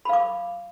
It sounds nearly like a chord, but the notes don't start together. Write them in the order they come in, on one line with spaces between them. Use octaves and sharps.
B5 F5 D6